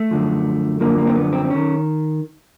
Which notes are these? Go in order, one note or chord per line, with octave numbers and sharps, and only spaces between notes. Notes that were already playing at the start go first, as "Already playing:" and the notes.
Already playing: A3
F#2 D3 F3
F#2 D3 F3 A#3
A#3
C4
B3
C4
C4
D#3 C#4